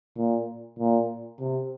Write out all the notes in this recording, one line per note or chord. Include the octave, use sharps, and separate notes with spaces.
A#2
A#2
C3